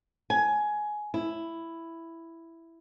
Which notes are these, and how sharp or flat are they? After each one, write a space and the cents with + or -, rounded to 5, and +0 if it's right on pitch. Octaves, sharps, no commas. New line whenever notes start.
G#5 +15
E4 +5